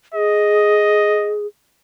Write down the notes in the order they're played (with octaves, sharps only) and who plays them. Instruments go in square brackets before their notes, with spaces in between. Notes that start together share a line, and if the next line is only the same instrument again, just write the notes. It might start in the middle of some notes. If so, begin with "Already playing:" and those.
[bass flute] G#4 [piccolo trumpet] D#5